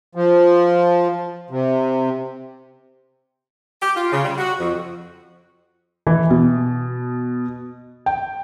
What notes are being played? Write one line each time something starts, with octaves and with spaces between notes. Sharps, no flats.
F3
C3
G4
F4
C#3
G3
F#4
F2
E3
B2
G5